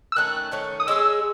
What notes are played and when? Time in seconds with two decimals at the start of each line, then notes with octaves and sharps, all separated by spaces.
0.12 E6
0.16 D#3 A3 C#4 F#6
0.52 D#3 A3 C#4
0.80 D#6
0.87 G#3 C#4 G#4 E6